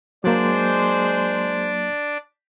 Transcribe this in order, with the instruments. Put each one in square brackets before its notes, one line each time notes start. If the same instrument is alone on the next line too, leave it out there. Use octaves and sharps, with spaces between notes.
[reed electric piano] F#3 A#3 [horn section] G#3 C5 [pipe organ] D4 D5